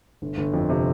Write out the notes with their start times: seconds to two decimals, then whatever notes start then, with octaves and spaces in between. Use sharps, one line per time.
0.22 G1
0.38 G1
0.54 F2
0.70 C3